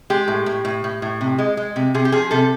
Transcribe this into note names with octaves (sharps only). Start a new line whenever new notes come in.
G#3 G4
A2
A2
A2
A2
A2
C3
G#3
G#3
C3
C3 G#4
G4
F3 G#4
C3 A4